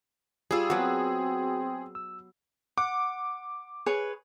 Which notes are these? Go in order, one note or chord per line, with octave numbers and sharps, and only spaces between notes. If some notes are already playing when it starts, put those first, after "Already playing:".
G3 F4 G#4 E6
F#3 B3 C4 F#4
E6
F#5 D6
G#4 B4 C#5